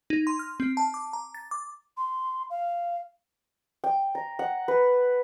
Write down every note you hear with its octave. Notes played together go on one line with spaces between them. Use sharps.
D#4
C6
F6
C4
A5
D6
A#5
A6
D6
C6
F5
G5
A#5
F#5
B4